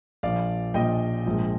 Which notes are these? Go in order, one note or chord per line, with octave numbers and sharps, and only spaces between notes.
A#1 A#2 F3 D5 F5
A#1 A#2 F3 D#5 G5
A#1 G#2 F3